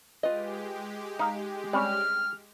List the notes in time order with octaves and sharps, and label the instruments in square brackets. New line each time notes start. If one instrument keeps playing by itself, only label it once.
[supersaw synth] G#3 G4 [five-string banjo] F4 B4 D#5
[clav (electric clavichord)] D#4 F5 A#5
[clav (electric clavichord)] G3 C#4 [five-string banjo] C4 [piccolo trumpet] F6